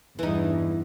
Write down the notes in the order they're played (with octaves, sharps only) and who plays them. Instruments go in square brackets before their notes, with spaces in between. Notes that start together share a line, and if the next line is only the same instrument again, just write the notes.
[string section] E2 G2 [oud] E3 D#4